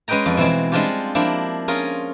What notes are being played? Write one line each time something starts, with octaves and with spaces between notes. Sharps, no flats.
G#3 C#4 B4 D#5 G5 A#5
F2
B2 E3 G#3 C4
G3 G#3 C4 D4 F4 G4
F3 A#3 D4 E4
C#4 F4 G#4 A#4